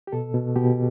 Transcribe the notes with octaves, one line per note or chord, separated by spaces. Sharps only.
G4
B2 A4
B2
B2 G4